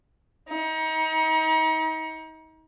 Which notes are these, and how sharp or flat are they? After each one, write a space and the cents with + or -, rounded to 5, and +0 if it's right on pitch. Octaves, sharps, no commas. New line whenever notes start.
D#4 +35